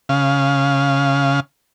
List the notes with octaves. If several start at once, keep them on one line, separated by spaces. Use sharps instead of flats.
C#3 F5